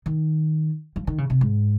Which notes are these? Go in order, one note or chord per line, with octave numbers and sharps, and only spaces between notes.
D#3
F3
D#3
C#3
C3
G#2